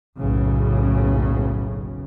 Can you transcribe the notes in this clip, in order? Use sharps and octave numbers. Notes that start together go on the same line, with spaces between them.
F#1 B1 A2 C#3